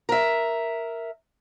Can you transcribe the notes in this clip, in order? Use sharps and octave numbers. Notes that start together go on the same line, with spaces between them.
A#4 E5